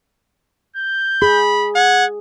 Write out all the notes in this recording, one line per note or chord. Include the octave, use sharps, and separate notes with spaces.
G6
G#4 B5
F#5 G#6